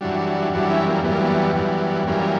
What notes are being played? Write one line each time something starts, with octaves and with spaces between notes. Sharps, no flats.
F#2 E3 G3 D4 F#4
F#2 E3 G3 D4 F#4
C#4 E4
A#3
F#2 E3 G3 B3
A#3
B3
F#2 E3 G3
F#2 E3 G3 A#3 C#4